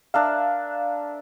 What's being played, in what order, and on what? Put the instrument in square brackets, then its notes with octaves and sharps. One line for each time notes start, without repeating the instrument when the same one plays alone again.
[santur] D4 A#4 E5 [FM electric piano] F5